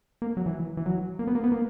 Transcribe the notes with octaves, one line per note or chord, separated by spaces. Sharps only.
A#3
F#3
E3
E3
F#3
A#3
B3
A#3
B3
A#3